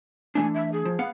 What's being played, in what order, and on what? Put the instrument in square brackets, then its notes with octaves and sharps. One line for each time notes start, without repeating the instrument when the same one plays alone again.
[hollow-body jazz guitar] E3 A3 D4 [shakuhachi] G#5
[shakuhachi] E5
G#4
[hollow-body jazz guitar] F3
B3 F5 F#5